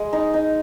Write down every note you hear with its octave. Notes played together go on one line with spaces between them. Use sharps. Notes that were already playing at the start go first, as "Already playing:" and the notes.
Already playing: G#3
D#4
D#4